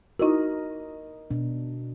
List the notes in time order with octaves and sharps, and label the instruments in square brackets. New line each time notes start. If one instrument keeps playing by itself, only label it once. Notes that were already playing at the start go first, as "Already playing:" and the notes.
[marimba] D#4 E4 F#4 [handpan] A#4 D#5
[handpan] B2 D4